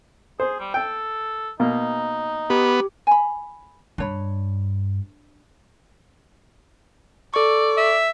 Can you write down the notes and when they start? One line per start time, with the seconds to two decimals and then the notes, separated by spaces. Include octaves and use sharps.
0.40 G#4 C5
0.59 G3
0.74 A4 G5
1.60 B2 A#3 D#4
2.50 B3 G4
3.07 G#5 B5
3.98 G2 D4 C#5 B5
7.34 A4 D5 C#6
7.77 E5